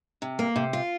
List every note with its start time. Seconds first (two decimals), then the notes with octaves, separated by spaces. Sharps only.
0.22 C3
0.39 A#3
0.56 C3
0.73 F4